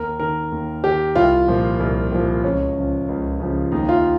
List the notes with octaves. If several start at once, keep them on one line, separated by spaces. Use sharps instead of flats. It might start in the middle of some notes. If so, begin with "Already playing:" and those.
Already playing: D#2 A#4
D#3 A#4
D#2
D#3 G4
C2 F4
A#2 F3
C2
A#2 F3
C#2 C#4
C#3 F3
C#2
C#3 F3
D#2 D#4
F4